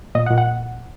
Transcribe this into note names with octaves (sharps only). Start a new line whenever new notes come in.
A#2 D#5
F#5
A#2
F#5